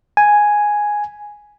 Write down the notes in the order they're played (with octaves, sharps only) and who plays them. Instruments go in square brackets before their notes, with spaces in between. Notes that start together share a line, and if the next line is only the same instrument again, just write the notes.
[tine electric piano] G#5